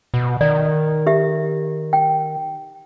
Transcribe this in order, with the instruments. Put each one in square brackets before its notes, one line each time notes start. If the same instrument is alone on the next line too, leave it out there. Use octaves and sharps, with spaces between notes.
[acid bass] B2
[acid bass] D#3 [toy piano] D5
[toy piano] G4 E5
G5